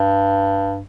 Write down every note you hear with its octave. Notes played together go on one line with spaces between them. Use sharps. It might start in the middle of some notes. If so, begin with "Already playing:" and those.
Already playing: G2